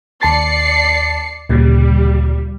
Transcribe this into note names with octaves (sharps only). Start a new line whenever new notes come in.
D#2 D5 A5 A6 C7 C#7
D2 A#2 C#3 G3